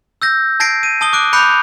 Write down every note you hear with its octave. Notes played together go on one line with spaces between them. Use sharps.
E6 G6 A#6
A5 G#6 A#6 C7 D7
D#7
A5 D#6 G7
D6 F#6 D7
B5 D6 F#6 G6 C#7 F7